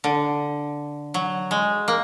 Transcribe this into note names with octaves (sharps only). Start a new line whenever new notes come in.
D3
F#3
G#3
A#3